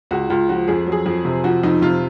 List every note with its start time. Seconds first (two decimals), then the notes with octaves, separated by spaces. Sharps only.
0.11 C#2 F#4
0.30 C#2 F4
0.49 F3 F#4
0.68 F2 G#4
0.87 F#3
0.92 G#4
1.06 F2
1.25 C3
1.44 F3 F#4
1.63 F2 D#4
1.82 C3 F4